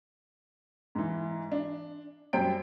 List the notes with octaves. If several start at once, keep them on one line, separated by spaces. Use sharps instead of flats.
G#2 E3
D4
F#2 G3 C5 G5 D7